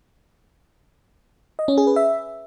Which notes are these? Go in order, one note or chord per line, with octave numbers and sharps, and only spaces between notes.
D#5
C#4
G#4
B4
E5